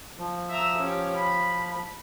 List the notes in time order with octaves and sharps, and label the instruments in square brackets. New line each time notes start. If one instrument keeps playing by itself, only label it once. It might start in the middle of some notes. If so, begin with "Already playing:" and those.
[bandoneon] F3
[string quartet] E5 A#5 E6
C#4 G4
B5